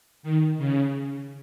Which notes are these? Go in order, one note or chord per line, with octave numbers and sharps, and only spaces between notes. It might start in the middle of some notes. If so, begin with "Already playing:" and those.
D#3
C#3